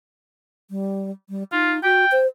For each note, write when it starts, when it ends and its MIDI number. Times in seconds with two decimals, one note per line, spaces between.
0.70 1.11 55
1.30 1.43 55
1.52 1.82 63
1.52 1.74 65
1.83 2.05 66
1.83 2.15 79
2.12 2.27 72